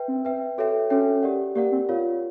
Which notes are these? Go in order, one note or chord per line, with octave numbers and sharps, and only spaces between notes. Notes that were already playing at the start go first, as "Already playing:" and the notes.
Already playing: B4 E5 G5
C4
B4 E5 G5
F#4 A4 C#5 E5 G5
C#4 F#4 A4 C#5 E5 G5
G4 A#4 D5 F#5
A#3 G4 A#4 D5 F#5
C4
F4 A#4 C#5 F5